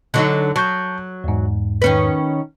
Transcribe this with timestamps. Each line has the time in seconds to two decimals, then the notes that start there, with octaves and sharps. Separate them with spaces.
0.14 D3 F#3 D#4 A4 C#5
0.56 F#3 A5 C#6 G6
1.24 E2 G#2
1.82 D#3 C#4 B4